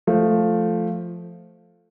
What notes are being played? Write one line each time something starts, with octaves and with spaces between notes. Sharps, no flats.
F3 A3